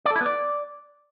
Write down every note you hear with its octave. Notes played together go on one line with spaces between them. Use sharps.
D5
A4
E4
B3
D5